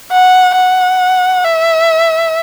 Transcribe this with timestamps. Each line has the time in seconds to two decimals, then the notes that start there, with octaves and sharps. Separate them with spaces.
0.12 F#5
0.55 F#5
1.44 E5